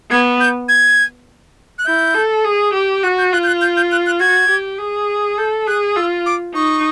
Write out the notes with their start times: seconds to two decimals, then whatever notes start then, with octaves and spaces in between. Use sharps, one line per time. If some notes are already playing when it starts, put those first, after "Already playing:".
0.11 B3 G#6
0.40 G6
0.69 G#6
1.78 F#6
1.87 E4 G6
2.15 A4
2.45 G#4
2.74 G4
3.03 F#4 F#6
3.18 G6
3.33 F4 F#6
3.44 G6
3.47 F#6
3.61 G6
3.77 G6
3.92 F#6
4.06 F#6
4.20 F#4 G#6
4.50 G4
4.79 G#4
5.38 A4 G6
5.67 G#4 F#6
5.96 F4 E6
6.26 D6
6.55 D#4 C#6